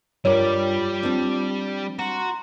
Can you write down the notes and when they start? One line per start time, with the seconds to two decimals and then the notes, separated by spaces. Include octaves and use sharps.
0.25 G2 G3 F4 A#4 C#5 D5
1.03 C4 D4
1.99 F#4 A#5 C6